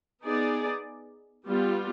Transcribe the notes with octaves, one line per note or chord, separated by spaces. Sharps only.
B3 D#4 G#4 D5
G3 B3 F4